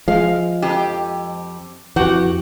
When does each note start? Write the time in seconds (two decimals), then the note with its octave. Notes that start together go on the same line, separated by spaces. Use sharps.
0.08 F3 G#3 F5
0.62 F2 G4
1.96 F2 E3 F#4 G4 F#5